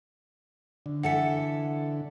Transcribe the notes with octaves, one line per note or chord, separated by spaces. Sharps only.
D3
E3 A4 E5 F#5 C#7